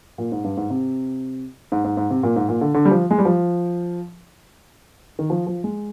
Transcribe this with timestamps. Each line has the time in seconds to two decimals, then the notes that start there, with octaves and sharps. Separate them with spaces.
0.18 A#2
0.32 G#2
0.44 G2
0.57 G#2
0.70 C3
1.72 G#2
1.84 G#2
1.97 G#2
2.10 C3
2.23 A#2
2.36 G#2
2.49 A#2
2.61 D3
2.74 D3
2.85 G3
2.91 F3
3.11 G#3
3.18 G3
3.25 F3
5.19 D#3
5.30 F3
5.47 F3
5.64 G#3